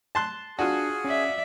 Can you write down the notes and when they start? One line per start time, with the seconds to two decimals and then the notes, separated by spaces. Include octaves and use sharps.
0.15 A5 C6 F#6
0.59 D4 F4 F#4 G#4 G#5
1.05 C#4 D5 E5